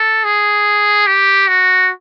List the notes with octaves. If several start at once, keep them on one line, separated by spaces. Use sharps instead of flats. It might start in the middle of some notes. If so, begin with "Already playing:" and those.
Already playing: A4
G#4
G4
F#4